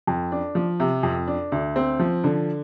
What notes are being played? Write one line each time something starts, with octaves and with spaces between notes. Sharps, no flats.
F2
D4
F3
C3
F2
D4
D2
C4
F3
D3